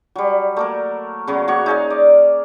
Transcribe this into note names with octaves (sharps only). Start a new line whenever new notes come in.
F#3 G3
A3 A#3 A#4
C#3 F#3 B3
A#3 F#4 C#5 C#6
D#4 G#4 F5
D5